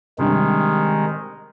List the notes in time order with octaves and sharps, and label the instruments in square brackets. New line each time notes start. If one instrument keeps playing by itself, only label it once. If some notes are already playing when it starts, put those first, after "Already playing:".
[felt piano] C3 G3 D4 [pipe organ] D#3 G#3